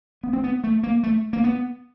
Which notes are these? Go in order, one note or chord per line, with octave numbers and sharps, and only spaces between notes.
B3
C4
B3
A3
A#3
A3
A#3
B3